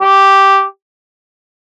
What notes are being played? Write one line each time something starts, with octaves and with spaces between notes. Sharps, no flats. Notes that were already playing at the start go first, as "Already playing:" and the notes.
G4